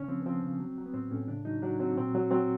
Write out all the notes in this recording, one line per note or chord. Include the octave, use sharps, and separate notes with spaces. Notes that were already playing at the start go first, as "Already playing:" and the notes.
Already playing: C#3 C#4
F3 C4
B3
F3 C4
C#3
F#3
F#3
B3
A2 C4
A2 C#4
C#3 D4
F#3 D#4
F#3 D4
F#3 C4
A#2 C4
F#3
F#3 C4